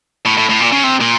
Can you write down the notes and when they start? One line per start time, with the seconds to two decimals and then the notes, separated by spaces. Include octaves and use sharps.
0.25 A2
0.37 A2
0.49 A2
0.60 A#2
0.72 C#3
0.83 C3
1.01 A#2